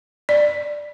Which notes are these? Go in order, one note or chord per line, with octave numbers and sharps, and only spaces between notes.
D5